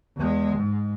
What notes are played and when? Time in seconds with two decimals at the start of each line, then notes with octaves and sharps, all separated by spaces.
0.16 E2 G#3
0.56 G#2